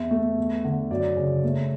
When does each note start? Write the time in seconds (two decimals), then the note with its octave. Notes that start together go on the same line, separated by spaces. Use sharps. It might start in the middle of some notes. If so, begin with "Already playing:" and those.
Already playing: E2 E5
0.11 A3
0.38 E2
0.64 D3
0.91 F#2 D5
1.17 C#3
1.44 A3